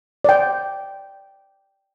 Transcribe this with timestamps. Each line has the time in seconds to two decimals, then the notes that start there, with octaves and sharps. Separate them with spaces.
0.24 D5 G5